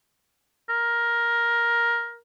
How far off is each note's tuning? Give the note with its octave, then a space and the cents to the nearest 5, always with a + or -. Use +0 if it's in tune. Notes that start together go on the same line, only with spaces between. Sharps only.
A#4 +10